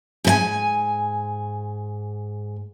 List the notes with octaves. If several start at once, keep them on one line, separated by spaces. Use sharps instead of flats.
G#2 B4 G#5